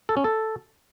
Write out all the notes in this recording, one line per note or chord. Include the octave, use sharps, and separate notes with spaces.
A4
C#4
A4